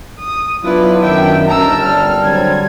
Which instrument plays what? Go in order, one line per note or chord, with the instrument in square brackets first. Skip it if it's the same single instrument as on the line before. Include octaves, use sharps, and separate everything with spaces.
[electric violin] D#6
[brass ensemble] F#3 B3 D4 [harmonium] E4 F4 [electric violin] B4
[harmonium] F#2 D#3 [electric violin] E5 G5
[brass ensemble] G1 D#2 A5 [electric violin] A#4 E6 [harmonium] A#5
[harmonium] G3 [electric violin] F6
[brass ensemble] D3 F#3 C4 [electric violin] G#6